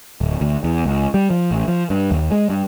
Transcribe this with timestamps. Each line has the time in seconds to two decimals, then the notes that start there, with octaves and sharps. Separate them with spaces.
0.21 D1
0.41 D2
0.64 E2
0.85 C#2
1.14 G3
1.30 F3
1.51 A1
1.68 F3
1.90 G2
2.11 D#2
2.31 G#3
2.50 G2